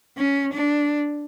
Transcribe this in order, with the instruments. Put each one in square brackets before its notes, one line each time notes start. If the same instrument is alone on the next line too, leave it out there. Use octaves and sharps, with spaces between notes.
[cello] C#4
D4